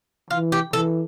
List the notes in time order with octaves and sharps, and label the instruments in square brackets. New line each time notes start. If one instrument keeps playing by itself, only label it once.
[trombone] E3 [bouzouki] F4
[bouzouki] G4
[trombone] E3 [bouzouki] A4